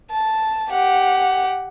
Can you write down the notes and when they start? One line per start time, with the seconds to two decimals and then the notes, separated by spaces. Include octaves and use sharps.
0.11 A5
0.70 G4 F#5